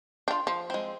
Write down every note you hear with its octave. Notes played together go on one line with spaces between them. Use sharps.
D4 F4 G5
F3
G#3 C4